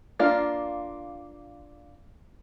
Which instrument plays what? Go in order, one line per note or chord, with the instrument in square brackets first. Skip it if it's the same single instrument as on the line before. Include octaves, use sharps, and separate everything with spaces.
[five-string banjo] A#3 D4 F4